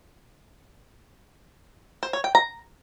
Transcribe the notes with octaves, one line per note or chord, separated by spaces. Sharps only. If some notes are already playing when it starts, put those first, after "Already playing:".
C5
C#5
G5
A#5